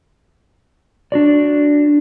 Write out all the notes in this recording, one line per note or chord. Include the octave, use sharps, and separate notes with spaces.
D4 F#4 D5